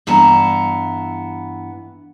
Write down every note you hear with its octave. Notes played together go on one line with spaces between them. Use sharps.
G2 E3 B3 A5 A#5